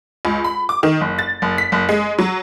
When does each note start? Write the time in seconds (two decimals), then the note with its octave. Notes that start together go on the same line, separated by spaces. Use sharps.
0.25 C#2
0.44 B5
0.69 D6
0.83 D#3
1.01 F#1
1.19 A6
1.42 F#1
1.58 B6
1.72 F#1
1.89 G#3
2.18 F#3